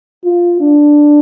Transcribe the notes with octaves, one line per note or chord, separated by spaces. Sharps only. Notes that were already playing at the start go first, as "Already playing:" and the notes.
F4
D4